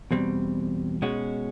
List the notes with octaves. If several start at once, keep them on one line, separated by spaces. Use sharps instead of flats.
E2 B2 G3 C4
B2 G#3 C#4 F#4